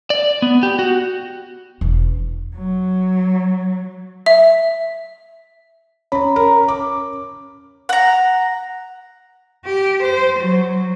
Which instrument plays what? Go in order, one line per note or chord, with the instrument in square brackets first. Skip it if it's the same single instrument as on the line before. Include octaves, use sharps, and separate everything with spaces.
[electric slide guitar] D5
B3
G4
F#4
[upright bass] E1
[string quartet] F#3
[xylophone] E5
[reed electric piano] C#4 C#5 [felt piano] A#5 B5
[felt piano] A#4
D6
[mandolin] F#5 A#5
[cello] G4
C5
F#3